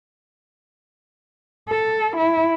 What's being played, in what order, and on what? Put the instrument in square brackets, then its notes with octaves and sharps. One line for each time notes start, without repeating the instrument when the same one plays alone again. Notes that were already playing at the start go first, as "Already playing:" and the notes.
[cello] A4
E4